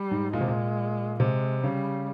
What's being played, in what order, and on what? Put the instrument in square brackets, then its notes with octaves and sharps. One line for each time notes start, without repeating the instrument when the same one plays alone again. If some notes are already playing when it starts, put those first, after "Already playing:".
Already playing: [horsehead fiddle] G3
[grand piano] G#2
[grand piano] A#2 [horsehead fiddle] G#3
[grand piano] C3
A#2
[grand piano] C3 [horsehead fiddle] G#3
[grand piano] C#3 [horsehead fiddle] G3